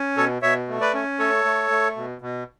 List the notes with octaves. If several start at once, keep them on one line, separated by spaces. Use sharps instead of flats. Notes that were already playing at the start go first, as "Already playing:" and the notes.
Already playing: C#4
B2 A4 C#5
B2 C#5 E5
A3
B4 D5
C#4
A3 A4 C#5
A3
A3
B2
B2